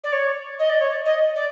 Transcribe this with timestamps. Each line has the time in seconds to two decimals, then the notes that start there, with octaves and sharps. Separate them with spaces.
0.03 D5
0.12 C#5
0.59 D#5
0.69 D5
0.79 C#5
0.89 D5
1.05 D#5
1.35 D5